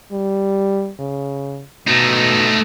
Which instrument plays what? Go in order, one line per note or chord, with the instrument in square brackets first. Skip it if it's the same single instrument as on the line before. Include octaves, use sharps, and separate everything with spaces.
[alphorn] G3
C#3
[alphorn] B2 [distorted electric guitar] A3 D#4